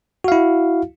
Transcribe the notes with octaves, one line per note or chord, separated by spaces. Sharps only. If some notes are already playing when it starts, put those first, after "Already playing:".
E4 F#4 F5